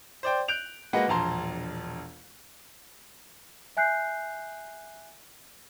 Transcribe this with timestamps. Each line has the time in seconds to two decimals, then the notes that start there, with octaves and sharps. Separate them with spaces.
0.23 C5 D5 G5
0.48 F#6 G6 D7 F7
0.93 G#3 A#3 F#4 B4 D#5 F#5
1.08 E1 A#1 A5 A#5 C6
3.77 E5 G#5 F#6 G6 C7